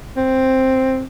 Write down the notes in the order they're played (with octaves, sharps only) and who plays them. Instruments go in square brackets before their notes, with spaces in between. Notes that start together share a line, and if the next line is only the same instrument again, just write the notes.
[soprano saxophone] C4